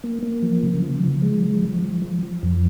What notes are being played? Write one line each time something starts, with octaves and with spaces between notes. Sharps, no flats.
A#3
A#3
F3
C#3
F3
F3
G#3
F3
F3
F3
F3
F3
F2